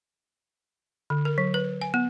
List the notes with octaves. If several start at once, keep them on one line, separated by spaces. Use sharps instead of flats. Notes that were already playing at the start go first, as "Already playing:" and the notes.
D3
A#4
F#3
B4
G#5
B3